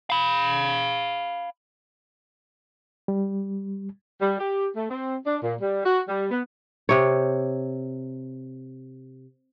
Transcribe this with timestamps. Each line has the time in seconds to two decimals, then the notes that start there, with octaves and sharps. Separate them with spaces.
0.10 F5 B5
3.08 G3
4.21 G3
4.39 G4
4.76 A3
4.90 C4
5.26 D4
5.43 A#2
5.61 G3
5.85 F#4
6.09 G3
6.31 B3
6.89 C3 C#5